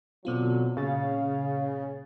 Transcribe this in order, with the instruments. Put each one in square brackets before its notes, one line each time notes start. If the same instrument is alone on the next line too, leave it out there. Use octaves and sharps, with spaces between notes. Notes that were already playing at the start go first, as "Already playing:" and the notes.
[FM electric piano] B2 C4 F4 [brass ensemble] D3 F#3
[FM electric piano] A#2 A6 [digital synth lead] C#3 [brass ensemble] F5